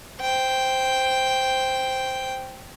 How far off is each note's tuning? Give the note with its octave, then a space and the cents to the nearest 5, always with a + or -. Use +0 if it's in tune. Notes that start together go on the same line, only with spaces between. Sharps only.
C5 +0 G5 +0